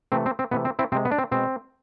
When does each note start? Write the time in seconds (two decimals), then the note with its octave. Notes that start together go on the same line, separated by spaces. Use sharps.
0.12 C3 E3 A3 C4
0.26 C4
0.39 C4
0.51 C3 E3 A3 B3
0.65 C4
0.79 C4 E4
0.92 C3 C4
0.95 G#3
1.05 B3
1.11 D4
1.18 C4
1.31 B2 G#3 C4